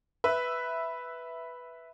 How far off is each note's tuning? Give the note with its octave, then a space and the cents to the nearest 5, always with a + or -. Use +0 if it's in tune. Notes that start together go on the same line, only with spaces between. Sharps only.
B4 +0 E5 +0